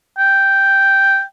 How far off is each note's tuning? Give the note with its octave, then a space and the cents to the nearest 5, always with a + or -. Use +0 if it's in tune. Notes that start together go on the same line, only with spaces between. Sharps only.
G5 -5